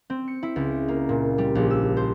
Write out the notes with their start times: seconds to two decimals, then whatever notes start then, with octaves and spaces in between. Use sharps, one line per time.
0.10 C4
0.28 C#7
0.43 E4
0.56 C#2
0.88 A#3
1.09 A#2
1.38 G3
1.55 A#1
1.71 E6
1.97 C5